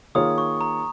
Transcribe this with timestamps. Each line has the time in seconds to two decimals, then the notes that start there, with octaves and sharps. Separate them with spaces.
0.15 D#3 A#3 F4 G#4 C#5 D#6
0.38 C#6
0.61 A#5